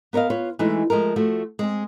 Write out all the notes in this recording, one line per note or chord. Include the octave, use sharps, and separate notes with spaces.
B3 A#4 C#5 D#5 F5
F4 B4 C#5
E3 G#3 A3 D#4 F#4
F3 G#3 A3 A#4
F3 A3 F#4
G#3 C4 G#4